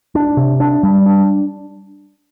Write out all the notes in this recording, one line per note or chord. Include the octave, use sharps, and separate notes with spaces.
D4
C3
D4
G3
D4